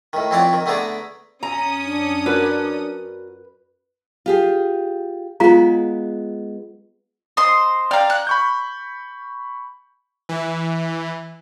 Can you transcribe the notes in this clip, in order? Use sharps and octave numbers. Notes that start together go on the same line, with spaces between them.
A2 D#3
F2 C4 E4 C#5 D5 F#5
D#3
D3 A3 B3 G#4 D5 A#5
F#2 C#4 A#5 D#6
D4
F#4 A#4 B4 D5
F4 G4 G#4
G#3 B3 F4 F5 A#5
C5 D#5 C6
D5 F5 G5 A#5 F6
F#6
B5 C#6 G6
E3